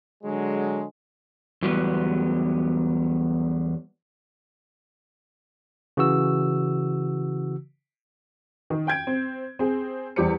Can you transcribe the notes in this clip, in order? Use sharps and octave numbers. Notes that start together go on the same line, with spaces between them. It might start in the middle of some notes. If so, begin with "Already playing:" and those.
D3 F#3 G#3
E2 F#3 G3 B3
C#3 E3 F#4 E6
D#3
G5 G6 G#6 D7
C4
C4 G#4
E2 G3 G4 C5 C#7